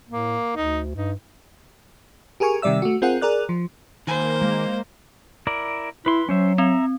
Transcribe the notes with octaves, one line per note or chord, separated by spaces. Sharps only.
A2 A#3
D2 D#4
G2 D#4
G4 G#4 A#4 G#5 C#6
C3 D#3 G3 D5 E5 E6
A3 F#4
C4 F4 G#4 A#4 F#5
G#4 A#4 D5 F#6
F3
D#3 A#3 C5 G#5
G#3
E4 A#4 D5
E4 B4 C6
F#3 C#4 C5 E5
C4 E5 A#5